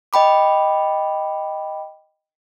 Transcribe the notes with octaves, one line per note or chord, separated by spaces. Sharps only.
D#5 G5 B5 D6